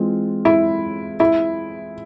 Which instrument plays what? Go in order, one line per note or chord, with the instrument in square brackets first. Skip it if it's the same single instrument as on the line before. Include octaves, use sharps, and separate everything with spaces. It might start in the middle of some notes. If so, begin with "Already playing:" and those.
Already playing: [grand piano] E3 G#3 C4 F4
[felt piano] E4
E4